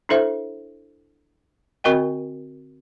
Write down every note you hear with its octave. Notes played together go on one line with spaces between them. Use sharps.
D4 E4 A4 C5 E5
D3 C4 F#4 A#4 D#5 G5